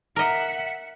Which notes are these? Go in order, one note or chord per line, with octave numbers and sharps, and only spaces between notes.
A#4 D#5 E5 F#5